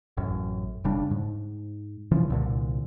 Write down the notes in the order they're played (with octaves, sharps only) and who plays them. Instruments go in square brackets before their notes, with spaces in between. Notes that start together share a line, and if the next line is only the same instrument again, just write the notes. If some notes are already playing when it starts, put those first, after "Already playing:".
[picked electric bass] A1 F#2
F1 C#3 G3 D4
G#2
C#3 E3 F3
C2 A#2 D3